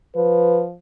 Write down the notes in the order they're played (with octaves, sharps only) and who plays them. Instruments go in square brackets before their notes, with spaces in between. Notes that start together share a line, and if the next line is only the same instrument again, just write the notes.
[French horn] F3 [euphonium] B4